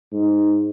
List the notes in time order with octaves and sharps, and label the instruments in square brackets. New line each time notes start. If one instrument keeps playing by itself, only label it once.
[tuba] G#2